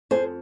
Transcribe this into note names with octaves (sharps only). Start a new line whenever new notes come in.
F2 G#4 C5